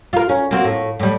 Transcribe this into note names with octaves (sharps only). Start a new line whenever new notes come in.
F4 A#4
C#4
A#3 C4 F#4
A2
A2 G3